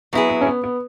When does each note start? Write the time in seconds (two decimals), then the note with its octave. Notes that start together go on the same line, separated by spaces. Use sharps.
0.13 F#3 B3 E4 G#4
0.30 B3
0.41 C#4
0.47 B3
0.64 B3